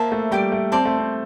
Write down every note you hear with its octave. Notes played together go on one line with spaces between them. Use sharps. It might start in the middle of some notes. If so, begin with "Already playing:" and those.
Already playing: A#3 C5 E5 A5
A3
G3 D5 G5 D6
A3
C4 D5 A5 C6
A3
C4